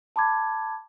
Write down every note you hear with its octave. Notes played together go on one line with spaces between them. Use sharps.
A5 B5 D6 G#6